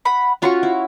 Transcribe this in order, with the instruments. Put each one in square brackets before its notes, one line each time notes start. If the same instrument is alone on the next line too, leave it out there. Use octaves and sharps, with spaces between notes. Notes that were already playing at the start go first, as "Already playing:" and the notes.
[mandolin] F#5 B5
[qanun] C#4 F4 F#4 [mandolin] C#5 C6 C#6
[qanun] E4